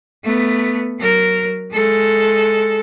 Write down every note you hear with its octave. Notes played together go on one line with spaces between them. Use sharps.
A3 B3
F#3 A#4
G#3 A4